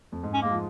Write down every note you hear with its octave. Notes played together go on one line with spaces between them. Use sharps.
F2
G#2
C#4
G#3 A#3
F3